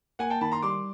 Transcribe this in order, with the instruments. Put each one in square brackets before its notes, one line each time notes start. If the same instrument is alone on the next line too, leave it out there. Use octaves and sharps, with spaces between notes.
[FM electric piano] A#3 [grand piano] F#5 G#5
[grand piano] G5 A5
[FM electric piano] D#3 [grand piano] A5 B5
[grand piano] A#5 C6
[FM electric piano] G3 [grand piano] C6 D6